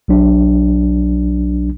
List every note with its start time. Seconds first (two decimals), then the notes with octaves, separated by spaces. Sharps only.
0.08 B1 F#3 D4